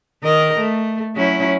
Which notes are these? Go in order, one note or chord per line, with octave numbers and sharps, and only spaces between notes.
D#3 A#4 D#5
A3
F#3 C#4 E4